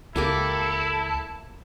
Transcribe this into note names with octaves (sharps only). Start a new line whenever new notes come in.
C#2 A#3 E4 G4 A4 A#4